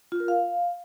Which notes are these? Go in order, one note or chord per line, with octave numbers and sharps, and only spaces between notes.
F4
A#4
F5